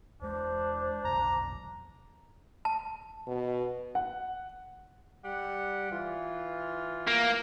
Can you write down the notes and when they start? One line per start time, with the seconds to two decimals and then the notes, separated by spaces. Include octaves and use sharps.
0.22 E2 G#3 D4 C5
1.05 F1 B1 A#5
2.65 A5
3.27 B2
3.95 F#5
5.25 G3 G4 F#5
5.91 E3 F4
7.07 A#3